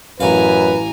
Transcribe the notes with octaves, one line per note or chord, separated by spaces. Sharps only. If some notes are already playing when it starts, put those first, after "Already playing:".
A1 F#2 B4 F5 G#5 A#5